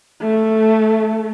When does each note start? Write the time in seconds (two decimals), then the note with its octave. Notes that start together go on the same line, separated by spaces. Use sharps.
0.22 A3